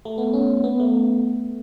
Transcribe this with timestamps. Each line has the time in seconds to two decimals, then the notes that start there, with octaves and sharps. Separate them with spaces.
0.05 A3
0.18 B3
0.33 C#4
0.64 B3
0.80 A3